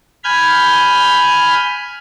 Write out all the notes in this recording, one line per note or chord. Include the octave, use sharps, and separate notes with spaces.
G#5 B5 F6 G6 G#6